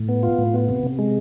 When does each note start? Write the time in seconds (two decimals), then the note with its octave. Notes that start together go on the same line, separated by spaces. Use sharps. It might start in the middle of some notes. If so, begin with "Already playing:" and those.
Already playing: A2
0.09 B3
0.23 F4
0.38 A2
0.54 B3
0.68 C3
0.83 C3
0.99 G#3